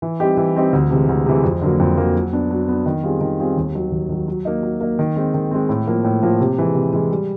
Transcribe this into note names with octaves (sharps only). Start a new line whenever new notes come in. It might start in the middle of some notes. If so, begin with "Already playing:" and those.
E3
G3 C4 D#4 G4
E3
G3 C4 D#4 G4
D2
C3 E3 G#3
D2
C3 E3 G#3
F2
D3 F#3 A#3
F2
D3 F#3 A#3
F#3
B3 D4
F#3
B3 D4
D#3
G3 C4 F4 G#4
D#3
G3 C4 F4 G#4
D#2
D#3 F#3
D#2
D#3 F#3
F#3
A#3 D#4
F#3
A#3 D#4
D#3
G#3 C4
D#3
G#3 C4
A2
F3 A#3
A2
F3 A#3
C3
E3 G#3
C3
E3 G#3
G3